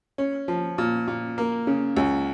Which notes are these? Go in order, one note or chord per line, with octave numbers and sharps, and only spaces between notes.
C#4
F3
A#2
A#2
A#3
C#3
C#2